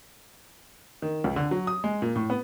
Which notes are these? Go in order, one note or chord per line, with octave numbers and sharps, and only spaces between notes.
D#3
C#2
D3
F#3
D#6
G#3
A#2
A2
B3